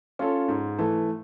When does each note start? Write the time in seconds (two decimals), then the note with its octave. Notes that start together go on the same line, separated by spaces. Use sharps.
0.19 C#4 F4 A4
0.48 G#2
0.78 E3 A3